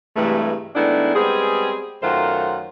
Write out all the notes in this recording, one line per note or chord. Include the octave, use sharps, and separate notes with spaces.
G2 C3 E3 G#3 A3
D#3 G#3 A3 B3 D4 E4
G3 G#3 B3 C4 G#4
F#2 D#3 A3 F4 C5 F#5